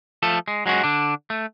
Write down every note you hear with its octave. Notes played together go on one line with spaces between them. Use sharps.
F3 A3 A4
G#3
F#3 G#3 C#4 F#4
D3 D4
A3